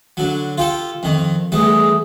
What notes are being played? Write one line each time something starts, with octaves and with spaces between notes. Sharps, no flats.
D3 F#3
F4 G4 A4
F2 D#3
E2 G3 A3 G#4